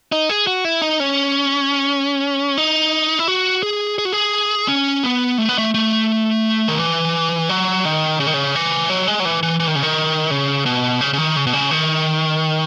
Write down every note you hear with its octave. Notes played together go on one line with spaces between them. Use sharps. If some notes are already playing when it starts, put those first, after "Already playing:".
D#4
G#4
F#4
E4
D#4
C#4
D#4
E4
F#4
G#4
G#4
F#4
G#4
C#4
B3
A3
B3
A3
A3
D#3
E3
F#3
D#3
C#3
D#3
C#3
E3
F#3
G#3
F#3
E3
E3
E3
D#3
C#3
D#3
C#3
B2
C#3
C#3
D#3
C#3
B2
C#3
D#3